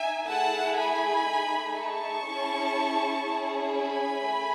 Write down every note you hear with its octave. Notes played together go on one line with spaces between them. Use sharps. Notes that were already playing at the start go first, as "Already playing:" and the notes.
Already playing: D#4 E5 G#5
A3 E4 G#4 F#5 A5
G#5 B5
A3 D#4 G#4
A5 C#6
C#4 E4 G#4
C#4 E4 G#4
G#5 B5
A3